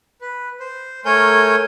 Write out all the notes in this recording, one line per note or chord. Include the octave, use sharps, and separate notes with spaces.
B4
C5
A3 A#4 C#5 G#5 G6